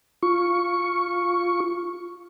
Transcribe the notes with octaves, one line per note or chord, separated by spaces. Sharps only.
F4 C#6